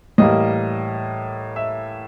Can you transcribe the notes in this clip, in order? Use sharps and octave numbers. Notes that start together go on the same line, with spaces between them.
A2 E3 G3 A#3 D#5
E5